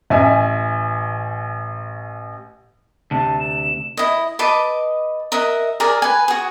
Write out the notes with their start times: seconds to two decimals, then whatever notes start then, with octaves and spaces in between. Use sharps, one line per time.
0.10 A1 E5 G#5
3.11 D2 C3 A5
3.40 E7
3.97 E4 D#5
4.39 B4 D#5 A5 D6
5.32 A#4 D#5 E5 F#5
5.80 G#4 A#4 D5 A#5
6.02 B4 G#5
6.28 F#4 G#4